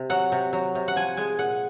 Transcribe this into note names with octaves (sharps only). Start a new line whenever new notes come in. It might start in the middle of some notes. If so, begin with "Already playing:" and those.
Already playing: C3
F#3 F#5
C3
F#3
C3
F#5
F3 G#5
G#3 G#5
A#2 F#5